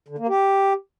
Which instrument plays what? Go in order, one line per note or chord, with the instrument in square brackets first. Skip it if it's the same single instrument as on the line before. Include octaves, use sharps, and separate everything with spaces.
[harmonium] D3
A#3
G4